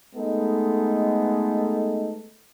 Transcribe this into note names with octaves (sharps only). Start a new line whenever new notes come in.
G#3 A3 B3 D#4 A4